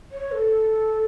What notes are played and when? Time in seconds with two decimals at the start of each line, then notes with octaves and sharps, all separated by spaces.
0.12 C#5
0.32 A4